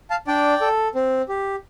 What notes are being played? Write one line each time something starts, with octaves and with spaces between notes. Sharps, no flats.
F5 A5
D4 D5 G5
A4
C4
G4